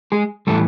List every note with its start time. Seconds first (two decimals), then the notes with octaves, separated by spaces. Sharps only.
0.12 G#3 G#4
0.47 A2 E3 G3 A3 A4